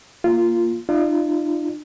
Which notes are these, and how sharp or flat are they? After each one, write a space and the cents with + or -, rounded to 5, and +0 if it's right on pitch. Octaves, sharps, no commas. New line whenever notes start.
A#3 +0 F4 -10
D4 +45 F4 -30